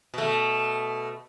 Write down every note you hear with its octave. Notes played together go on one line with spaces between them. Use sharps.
B2 A3